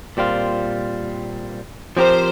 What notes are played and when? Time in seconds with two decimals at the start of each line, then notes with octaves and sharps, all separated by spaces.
0.17 A#2 G3 C4 F4
1.97 F3 C4 G4 A#4 C5